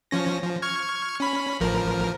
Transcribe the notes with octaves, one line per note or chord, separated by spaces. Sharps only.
F3 C#4 A#6
F3
C#6 F6 G#6
C#4 B5
A1 F3 A#4